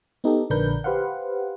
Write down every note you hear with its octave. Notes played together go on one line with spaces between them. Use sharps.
B3 D#4 G4 A4
A#1 D3 D4 A#4 B4 G6
G4 B4 C5 F5 F#5